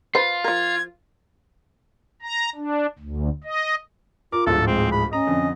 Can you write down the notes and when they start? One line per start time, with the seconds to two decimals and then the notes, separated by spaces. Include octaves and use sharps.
0.15 F4 B4 C5
0.44 F3 A#4 G#6
2.22 A#5
2.56 D4
2.99 D2
3.44 D#5
4.32 F4 A#4 D6
4.47 D1 G#2 F3 A4
4.67 G#3 C4
4.92 B5
5.13 C#4 D#5 A#5
5.27 F2 D3